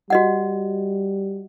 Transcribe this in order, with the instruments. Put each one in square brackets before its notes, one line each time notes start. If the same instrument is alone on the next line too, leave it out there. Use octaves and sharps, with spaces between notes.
[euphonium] G3 [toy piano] F#4 D#5 F#5